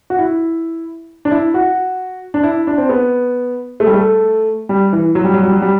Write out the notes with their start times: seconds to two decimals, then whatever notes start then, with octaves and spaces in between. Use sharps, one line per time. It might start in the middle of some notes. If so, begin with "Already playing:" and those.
0.10 F#4
0.19 E4
1.25 D4
1.31 E4
1.54 F#4
2.34 D4
2.43 E4
2.67 D4
2.78 C4
2.89 B3
3.80 A3
3.87 G3
3.94 A3
4.69 G3
4.93 E3
5.15 F#3
5.24 G3
5.34 F#3
5.43 G3
5.52 F#3
5.62 G3